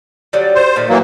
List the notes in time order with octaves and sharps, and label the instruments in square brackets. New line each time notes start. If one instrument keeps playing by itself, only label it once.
[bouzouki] D3 F#3 G3
[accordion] C5
[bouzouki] A#2 D#3 A3
[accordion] E3 F#3 A#3